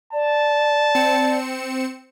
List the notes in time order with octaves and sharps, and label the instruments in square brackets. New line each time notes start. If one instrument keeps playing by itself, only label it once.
[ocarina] D5 [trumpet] A5
[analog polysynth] C4 C#7 E7